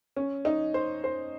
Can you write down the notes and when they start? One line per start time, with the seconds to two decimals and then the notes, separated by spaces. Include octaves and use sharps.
0.16 C#4
0.45 D#4
0.74 C5
1.04 C5